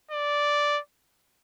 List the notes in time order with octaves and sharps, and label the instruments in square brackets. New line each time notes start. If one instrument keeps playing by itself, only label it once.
[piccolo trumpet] D5